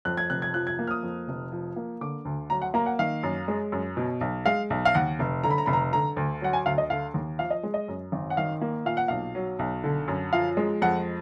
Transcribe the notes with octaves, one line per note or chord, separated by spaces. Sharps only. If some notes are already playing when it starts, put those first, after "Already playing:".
F2 F#6
G#6
F1 F#6
G#6
F3 F#6
G#6
A#3
F6
D#6
F2
F1
F3
A#3
D3 D6
D2
F#3 A#5
F#5
A#3 A#5
F#5
D#3 F5
F#2
G#3
F#2
B2
B1
G#3 F5
B1
F5
D#2 F#5
F1
D3 A#5
B5
A#5
F1 B5
A#5
D3 A#5
D2
F#3 F#5
G#5
D2 F5
D#5
D3 F5
D#2
F3 F5
D#5
G#3
D#5
F#2
G#1
F#5
D#3 F5
A#3
A#2 F5
F#5
B1 F5
F#3
B1
D3
F#2
F3 F5
G#3
F2 F#5